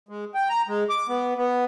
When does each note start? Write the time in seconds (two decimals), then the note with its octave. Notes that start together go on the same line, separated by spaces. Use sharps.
0.09 G#3
0.35 G5
0.49 A#5
0.68 G#3
0.90 D6
1.09 B3
1.37 B3